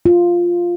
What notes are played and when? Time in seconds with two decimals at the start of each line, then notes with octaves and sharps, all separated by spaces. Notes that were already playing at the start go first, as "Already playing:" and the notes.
0.06 F4